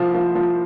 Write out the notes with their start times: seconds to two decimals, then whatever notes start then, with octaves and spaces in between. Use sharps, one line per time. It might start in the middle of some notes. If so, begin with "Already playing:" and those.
Already playing: C2 F3 C5
0.14 F3
0.35 F3